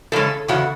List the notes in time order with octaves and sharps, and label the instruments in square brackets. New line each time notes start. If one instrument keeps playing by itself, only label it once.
[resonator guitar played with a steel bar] E2 C#3 G#3 C#4 A4
E2 C#3 F#4